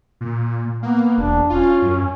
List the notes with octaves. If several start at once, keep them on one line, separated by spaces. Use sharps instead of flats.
A#2
A#3 B3
E1 D4
C#4 F4
F#2